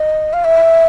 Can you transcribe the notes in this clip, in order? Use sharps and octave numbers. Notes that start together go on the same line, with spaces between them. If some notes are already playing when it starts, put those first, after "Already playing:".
Already playing: D#5
F5
E5